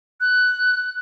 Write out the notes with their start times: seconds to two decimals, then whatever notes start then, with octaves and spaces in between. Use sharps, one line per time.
0.20 F#6